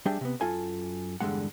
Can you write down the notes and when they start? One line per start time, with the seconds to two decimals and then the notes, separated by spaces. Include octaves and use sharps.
0.06 G3 D4 G#4 E5 G5
0.21 C3 B3
0.41 F#2 F4 A4 G#5
1.21 E2 G2 D3 D#3 G#3 F#5